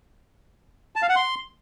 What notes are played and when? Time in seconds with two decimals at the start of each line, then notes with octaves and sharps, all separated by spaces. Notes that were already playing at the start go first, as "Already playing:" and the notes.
0.96 A5
1.02 F5
1.09 F#5
1.16 C6